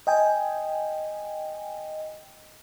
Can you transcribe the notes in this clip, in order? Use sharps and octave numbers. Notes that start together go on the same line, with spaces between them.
D#5 G5 G#5